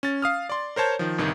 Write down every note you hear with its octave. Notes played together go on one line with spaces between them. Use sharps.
C#4 A6
F5 D#6 F6
D5 C6
A#4 C5 C#5 A5 G6
D#3 F3
G1 C2 D#3